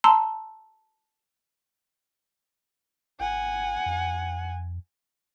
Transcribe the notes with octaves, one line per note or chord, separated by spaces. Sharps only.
A5 A#5 C6 E6
G#1 F#5 G#5
F2